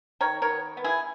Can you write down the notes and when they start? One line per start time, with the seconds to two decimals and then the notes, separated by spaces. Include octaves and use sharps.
0.21 D#3 A#4 C#5
0.42 A#4 C#5
0.49 B3
0.77 B3
0.84 E4 G#4